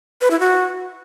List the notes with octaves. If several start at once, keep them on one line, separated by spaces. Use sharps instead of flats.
B4
E4
F#4